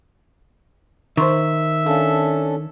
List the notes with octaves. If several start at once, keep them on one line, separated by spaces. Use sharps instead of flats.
D#3 C5 E5 C6 C#6
C#4 D4 A4 F5